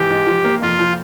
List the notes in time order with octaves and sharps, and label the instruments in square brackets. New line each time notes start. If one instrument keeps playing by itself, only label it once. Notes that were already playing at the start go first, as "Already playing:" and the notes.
Already playing: [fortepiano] G#2 E3 [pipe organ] G4
[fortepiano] G#2
F3
A#3
[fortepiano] F2 [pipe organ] F4
[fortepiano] F3